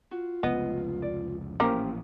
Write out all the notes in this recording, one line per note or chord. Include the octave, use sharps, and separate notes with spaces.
F4 F#4
F1 C#2 B3 D#5
D5
A1 A#2 F3 A#3 C#4 G4 A#4 C5